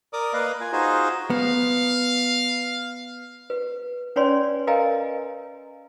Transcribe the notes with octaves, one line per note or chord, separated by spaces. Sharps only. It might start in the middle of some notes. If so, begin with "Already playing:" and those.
A#4 D5 D6 D#6
A#3 B4 D#5 F5
F4 G#5
D#4 F4 F#4 G#4 C5 D#5
B3 F5
B4
C#4 B4 C#5 D5 G#5 C6
A#4 B4 D#5 F5 G#5 A#5